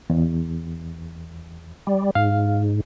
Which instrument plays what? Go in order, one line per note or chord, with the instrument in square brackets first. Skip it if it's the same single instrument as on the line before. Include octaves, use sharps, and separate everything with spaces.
[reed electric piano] E2
[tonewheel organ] G3
[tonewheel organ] G#2 [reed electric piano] F5